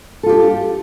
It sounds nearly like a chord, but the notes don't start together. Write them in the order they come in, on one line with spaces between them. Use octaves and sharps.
A4 F4 G4 D4